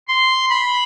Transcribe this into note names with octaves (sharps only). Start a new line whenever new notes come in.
C6
B5